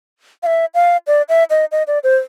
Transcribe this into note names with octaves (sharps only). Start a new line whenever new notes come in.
F5
E5
F5
D5
E5
D#5
D#5
D5
C5